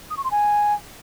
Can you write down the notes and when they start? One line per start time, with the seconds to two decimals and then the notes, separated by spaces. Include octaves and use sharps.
0.10 D#6
0.17 C#6
0.24 C6
0.31 G#5